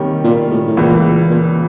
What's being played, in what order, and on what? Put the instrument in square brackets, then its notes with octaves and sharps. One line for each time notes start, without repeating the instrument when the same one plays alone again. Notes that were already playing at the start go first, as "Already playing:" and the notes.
Already playing: [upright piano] C3 D#3 G3 A#3 C#4
[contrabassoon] A#2
A2
A2
[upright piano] C#2 C#3 E3 [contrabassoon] A#2
[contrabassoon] A#2